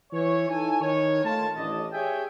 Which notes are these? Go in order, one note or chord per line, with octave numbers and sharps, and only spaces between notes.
E3 C#5
D#4 E4 A4 G#5
D#3 C#5
A3 F4 A5
A1 D4 D#5
G4 G#4 C#5 E5 G5 G#5